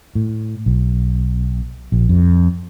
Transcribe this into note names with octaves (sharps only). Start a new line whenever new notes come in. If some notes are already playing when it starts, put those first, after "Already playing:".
A2
B1
A#1
F2